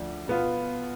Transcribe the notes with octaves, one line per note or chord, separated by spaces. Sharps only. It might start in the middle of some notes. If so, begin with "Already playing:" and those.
Already playing: D2 F3 D4
B2 B3 F4